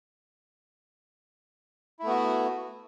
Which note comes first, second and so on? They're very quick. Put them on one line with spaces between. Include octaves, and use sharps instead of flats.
E4 A3 B3 F#4